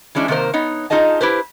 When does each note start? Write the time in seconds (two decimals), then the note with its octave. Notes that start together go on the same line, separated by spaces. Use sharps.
0.15 E3 G#3 C#4 D4 E4
0.28 C3 D#3 A#3 A#4 C5
0.53 B3 D#4 C#5
0.90 D#4 F4 G#4 D#5 A5
1.21 E4 G4 B4 C5